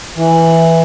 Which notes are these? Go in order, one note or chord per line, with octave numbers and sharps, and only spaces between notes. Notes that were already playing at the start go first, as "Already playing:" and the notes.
E3